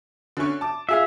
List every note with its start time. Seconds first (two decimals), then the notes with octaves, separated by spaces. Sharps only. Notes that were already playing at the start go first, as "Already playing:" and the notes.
0.37 D3 C#4 C#6
0.61 A5 D6
0.89 F4 G#4 E5 F5